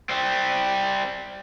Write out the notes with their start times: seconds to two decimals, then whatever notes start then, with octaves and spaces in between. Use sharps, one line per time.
0.10 G3 C4